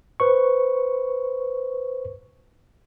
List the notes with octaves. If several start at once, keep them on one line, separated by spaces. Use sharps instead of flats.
B4 C5 C#6